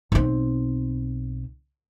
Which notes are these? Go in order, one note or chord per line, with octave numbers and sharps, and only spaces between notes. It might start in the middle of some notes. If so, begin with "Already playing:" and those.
B1 C4